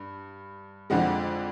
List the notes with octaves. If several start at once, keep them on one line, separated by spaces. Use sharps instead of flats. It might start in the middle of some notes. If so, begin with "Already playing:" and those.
Already playing: G2
F2 D3 F3 G#3 F#5